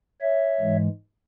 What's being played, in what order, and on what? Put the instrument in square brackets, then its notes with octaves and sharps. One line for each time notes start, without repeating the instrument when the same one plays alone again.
[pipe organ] C#5 E5
G#2 E3 G#3